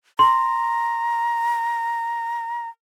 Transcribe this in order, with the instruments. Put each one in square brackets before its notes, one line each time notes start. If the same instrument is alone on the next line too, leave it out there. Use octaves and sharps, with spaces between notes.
[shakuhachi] A#5 [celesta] C6